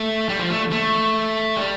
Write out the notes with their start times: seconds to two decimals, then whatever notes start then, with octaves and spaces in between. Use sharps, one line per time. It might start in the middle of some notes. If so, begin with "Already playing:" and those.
Already playing: A3
0.29 G3
0.39 F3
0.50 A3
0.71 A3
1.56 G3